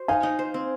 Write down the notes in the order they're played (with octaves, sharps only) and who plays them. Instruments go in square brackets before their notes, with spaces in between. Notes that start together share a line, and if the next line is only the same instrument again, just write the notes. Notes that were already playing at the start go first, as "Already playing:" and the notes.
Already playing: [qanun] F#4 C5
[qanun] D#4 [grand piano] F5 G#5
[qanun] D#4
C5
C4